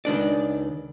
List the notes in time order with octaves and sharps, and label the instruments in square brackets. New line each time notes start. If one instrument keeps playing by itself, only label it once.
[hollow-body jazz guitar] C#2 D#3 D4 D5